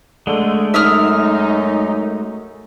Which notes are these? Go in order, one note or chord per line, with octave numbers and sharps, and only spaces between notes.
D3 G#3 A3
F#2 D#4 E5 D#6 F6